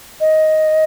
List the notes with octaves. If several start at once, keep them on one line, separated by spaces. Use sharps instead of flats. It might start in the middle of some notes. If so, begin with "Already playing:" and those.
D#5